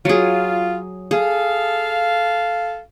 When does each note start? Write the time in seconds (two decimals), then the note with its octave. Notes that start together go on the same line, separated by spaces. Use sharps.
0.05 F#3 F4 G#4
1.11 G#4 A4 F5